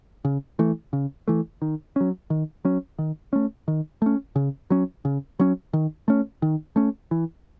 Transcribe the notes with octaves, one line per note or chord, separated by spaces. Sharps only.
C#3
E3 A3
C#3
E3 A3
D#3
F#3 C#4
D#3
F#3 C#4
D#3
A3 C#4
D#3
A3 C#4
C#3
F#3 C#4
C#3
F#3 C#4
D#3
A3 C#4
D#3
A3 C#4
E3